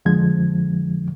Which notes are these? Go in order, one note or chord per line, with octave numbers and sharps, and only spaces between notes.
F2 D3 F3 G#3 G#6